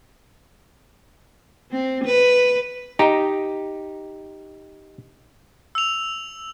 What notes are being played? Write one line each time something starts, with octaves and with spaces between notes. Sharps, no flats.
C4
B4
D#4 G4 D#5 A#5
E6 F7